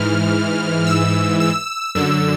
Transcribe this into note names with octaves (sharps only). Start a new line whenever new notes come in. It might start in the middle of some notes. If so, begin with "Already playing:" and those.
Already playing: G#2 E3 F6
E6
E6
F#2 D3 E6